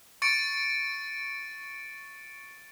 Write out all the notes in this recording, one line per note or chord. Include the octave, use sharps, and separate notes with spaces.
C#6 A6 C#7 D7